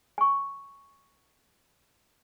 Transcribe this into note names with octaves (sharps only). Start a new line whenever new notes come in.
G#5 C#6